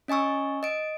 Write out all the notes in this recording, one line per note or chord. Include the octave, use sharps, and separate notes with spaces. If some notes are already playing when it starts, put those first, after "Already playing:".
C#4 D#5 G#5 C#6 E6
D#5 D7